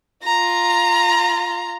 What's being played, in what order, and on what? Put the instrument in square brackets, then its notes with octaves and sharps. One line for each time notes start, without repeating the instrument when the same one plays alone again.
[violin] F4 A#5